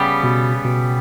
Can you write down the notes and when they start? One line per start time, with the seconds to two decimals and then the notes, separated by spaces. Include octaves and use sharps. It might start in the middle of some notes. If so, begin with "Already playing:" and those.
Already playing: C#3 G3 B3 G4
0.23 B2
0.65 B2